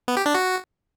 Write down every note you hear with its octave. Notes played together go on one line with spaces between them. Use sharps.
B3
G4
D4
F#4